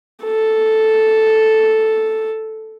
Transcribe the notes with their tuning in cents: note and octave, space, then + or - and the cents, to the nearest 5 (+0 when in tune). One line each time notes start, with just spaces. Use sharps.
A4 +0